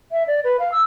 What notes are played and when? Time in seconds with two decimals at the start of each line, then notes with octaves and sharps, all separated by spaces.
0.12 E5
0.28 D5
0.44 B4
0.60 F5
0.72 E6